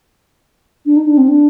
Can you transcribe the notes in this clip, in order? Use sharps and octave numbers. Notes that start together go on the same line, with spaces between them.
D4
D#4
D4
C4
D4